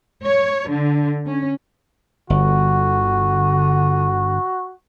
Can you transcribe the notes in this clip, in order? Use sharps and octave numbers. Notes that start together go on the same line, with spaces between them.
C#5
D3
C#4
G1 D3 F#4